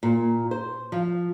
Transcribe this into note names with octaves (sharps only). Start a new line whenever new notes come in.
A#2
C5
F3